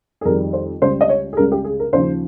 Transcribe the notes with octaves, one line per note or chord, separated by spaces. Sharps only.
G#4
F2 D#3 G3 A#4
C5
C#2 C#3 G3 C5
D#5
C#5
G#4
C#2 C#3 G3 A#4
G4
G#4
A#4
D#2 C#3 F3 C5